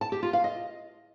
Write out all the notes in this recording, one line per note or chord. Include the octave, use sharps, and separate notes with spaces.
A5
G4
F4
F5
D#5